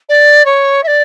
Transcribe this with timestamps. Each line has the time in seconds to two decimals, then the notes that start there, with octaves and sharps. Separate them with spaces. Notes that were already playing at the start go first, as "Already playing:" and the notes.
0.09 D5
0.45 C#5
0.83 E5
0.87 D5